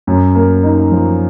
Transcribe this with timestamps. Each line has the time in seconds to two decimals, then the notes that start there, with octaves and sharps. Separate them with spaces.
0.07 F#2
0.35 A#3
0.63 D#4
0.92 F3